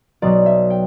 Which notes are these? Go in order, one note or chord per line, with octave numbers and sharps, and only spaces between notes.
B1 B2 F#3 D5
E5
G5